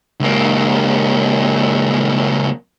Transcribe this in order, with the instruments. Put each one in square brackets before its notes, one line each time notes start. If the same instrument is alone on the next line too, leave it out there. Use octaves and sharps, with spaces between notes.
[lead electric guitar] C#2 A#3